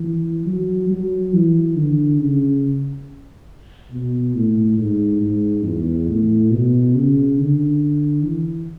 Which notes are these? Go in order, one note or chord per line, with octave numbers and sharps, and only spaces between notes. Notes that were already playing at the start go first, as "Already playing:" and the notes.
Already playing: E3
F#3
F#3
E3
D3
C#3
B2
A2
G#2
G#2
E2
A2
B2
C#3
D3
E3